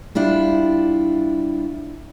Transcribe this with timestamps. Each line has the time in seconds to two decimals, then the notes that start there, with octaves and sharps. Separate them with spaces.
0.15 G3 D4 E4 F4